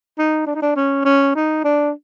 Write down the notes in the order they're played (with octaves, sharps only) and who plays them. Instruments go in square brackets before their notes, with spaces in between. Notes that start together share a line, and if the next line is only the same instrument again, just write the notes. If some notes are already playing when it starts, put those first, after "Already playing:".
[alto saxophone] D#4
D4
D#4
D4
C#4
C#4
D#4
D4